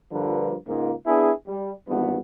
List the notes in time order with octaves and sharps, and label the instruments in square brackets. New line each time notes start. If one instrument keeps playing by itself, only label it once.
[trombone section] A#1 G2 D3 F3 A#3 B4
C#2 G#2 A#3
B3 D4 E4 G#4
G3
G#1 E2 G2 B3